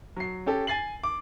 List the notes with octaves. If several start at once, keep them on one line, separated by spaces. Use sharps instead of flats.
F#3 C7
C#4 G4 A4
G#5 A6 C7 F#7
D6